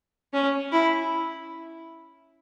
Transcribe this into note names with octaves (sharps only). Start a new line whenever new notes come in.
C#4
E4